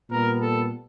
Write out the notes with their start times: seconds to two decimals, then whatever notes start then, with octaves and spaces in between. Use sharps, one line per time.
0.10 A#2 G3 B3 A#4
0.40 A4